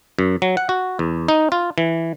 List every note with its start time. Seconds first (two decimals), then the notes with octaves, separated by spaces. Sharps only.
0.19 F#2
0.42 F#3
0.57 F#5
0.69 F#4
0.99 E2
1.28 D#4
1.52 F4
1.78 E3